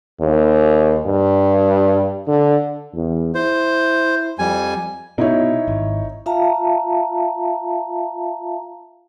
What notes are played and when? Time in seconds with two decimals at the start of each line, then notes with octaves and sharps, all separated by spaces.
0.21 D#2
1.07 G2
2.28 D3
2.94 E2
3.35 E4 C5
4.39 F2 G3 G#5
5.18 B2 D#4 E4 C#5
5.68 G#1
6.26 F4 E5 F5 A5 A#5